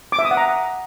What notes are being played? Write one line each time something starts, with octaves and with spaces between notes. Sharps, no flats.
D6
E5
D#6
F#5
A#5